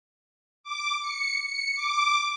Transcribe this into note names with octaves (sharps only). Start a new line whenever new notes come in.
D6
C#7
C#7
D6